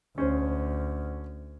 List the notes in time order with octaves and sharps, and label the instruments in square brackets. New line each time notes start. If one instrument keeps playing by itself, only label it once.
[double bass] D2 [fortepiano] C#4 C5